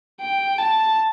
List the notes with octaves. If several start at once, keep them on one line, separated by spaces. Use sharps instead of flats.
G5
A5